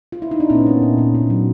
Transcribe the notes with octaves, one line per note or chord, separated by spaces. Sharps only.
F4
E4
D#4
D4
A#2 B3 C#4
A#3
A#2
A#2
A#2
F#3